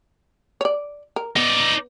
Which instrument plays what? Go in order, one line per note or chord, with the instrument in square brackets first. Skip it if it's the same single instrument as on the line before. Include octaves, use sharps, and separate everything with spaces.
[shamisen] C#5 D5
A#4
[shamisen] B3 [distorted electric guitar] D#4 D5